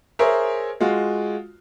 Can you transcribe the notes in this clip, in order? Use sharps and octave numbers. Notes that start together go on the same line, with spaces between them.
G#4 A#4 C5 C#5 E5
G#3 F4 F#4